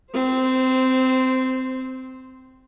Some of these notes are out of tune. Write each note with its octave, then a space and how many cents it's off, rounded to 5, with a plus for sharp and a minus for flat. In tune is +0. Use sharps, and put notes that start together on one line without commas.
C4 -15 C5 +0